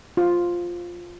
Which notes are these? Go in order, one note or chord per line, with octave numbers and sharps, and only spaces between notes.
F4